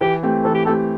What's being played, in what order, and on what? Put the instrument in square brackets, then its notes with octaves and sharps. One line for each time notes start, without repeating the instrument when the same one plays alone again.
[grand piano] E3 [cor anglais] G4
[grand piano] A3 C4 G4
[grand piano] E3 [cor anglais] A4
[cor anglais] G4
[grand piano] A3 C4 G4 [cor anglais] A4